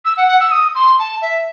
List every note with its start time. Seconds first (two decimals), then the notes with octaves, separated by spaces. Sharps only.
0.05 E6
0.17 F#5
0.28 F#5
0.40 E6
0.51 D#6
0.75 C6
0.99 A5
1.22 E5